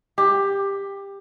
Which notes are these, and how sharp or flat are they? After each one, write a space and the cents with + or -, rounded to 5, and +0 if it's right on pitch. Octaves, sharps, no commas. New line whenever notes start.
G4 +15